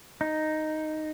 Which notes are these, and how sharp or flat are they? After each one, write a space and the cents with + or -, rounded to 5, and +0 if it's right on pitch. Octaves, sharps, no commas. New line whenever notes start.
D#4 -5